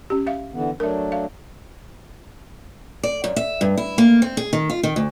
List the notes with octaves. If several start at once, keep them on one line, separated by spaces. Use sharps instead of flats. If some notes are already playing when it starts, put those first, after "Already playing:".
C#4 G4
E5 F5
D3 E3 B3
F#3 A3 D4 A#4 E5
F5
D5
F#2
E5
G2
E4
A#3
C4
G#4
D#3
F4
D#3
D2